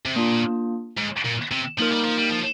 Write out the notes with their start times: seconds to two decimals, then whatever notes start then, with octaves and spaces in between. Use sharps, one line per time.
0.05 C3
0.16 A#2 A#3 D4 F4
0.97 G#2
1.25 A#2
1.52 C3
1.79 F3 A#3 D#4 A#4
1.91 G3
2.04 F3
2.17 G3
2.30 F3